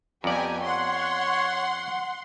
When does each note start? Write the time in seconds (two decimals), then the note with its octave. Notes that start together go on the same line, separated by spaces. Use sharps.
0.24 F2 B3 G4 D5 G#5 A#5
0.62 C#5 F#5 C6